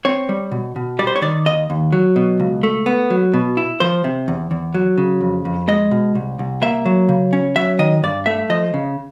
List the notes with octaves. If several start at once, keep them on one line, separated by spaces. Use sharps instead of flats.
C4 C#5
G3
B2
B2
G3 D5
C5
C#5
D#3 D5
D#2 D#5
D#2
F#3
B2
C#2
A3
B3
F#3
B2
E4
F3 C5
C3
E2
E2
F#3
C#3
F2
F2
G#3 D#5
B2
C2
C2
A#3 E5
F#3
C#3
C#4
F#3 E5
D#3 D#5
G2 D5
A3 E5
F3 D#5
C#3